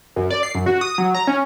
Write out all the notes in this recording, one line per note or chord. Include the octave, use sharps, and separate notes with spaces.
F#2
D5
C7
F#2
F#4
D#6
F#3
A#5
C#4